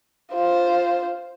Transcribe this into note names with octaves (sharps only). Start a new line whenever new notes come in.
F4 C5